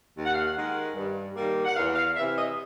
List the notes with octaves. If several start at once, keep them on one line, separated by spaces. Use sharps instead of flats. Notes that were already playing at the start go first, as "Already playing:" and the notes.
D#2
F#5
F5
F#5
D#3 G#3
G2
D#3 G3 A#3
F#5
E2 F5
F5
C3 E3 E5
D#5